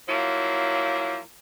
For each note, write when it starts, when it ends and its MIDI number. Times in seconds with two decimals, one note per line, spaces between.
0.08 1.19 53
0.08 1.19 54
0.08 1.19 58
0.08 1.19 64